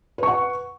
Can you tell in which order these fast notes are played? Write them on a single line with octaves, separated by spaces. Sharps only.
B4 C#6 F#5